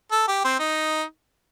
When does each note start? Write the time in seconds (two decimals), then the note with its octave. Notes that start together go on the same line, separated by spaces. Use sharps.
0.12 A4
0.28 G4
0.44 C4
0.59 D#4